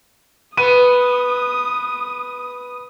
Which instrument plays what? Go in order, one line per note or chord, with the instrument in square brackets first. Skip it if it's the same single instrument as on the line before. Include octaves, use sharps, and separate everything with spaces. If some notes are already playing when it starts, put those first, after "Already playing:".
[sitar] B3 [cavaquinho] B4 [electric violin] D#6 [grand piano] D#7